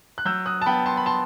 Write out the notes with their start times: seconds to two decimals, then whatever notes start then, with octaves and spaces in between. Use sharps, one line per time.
0.18 F#6
0.25 F#3 E6 G6
0.46 D#6 F#6
0.62 A5
0.66 B3 G5 B5
0.86 A5 C6
0.97 B5
1.06 A5 C6